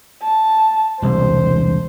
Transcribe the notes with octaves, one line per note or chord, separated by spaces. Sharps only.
A5
E1 C2 G3 C5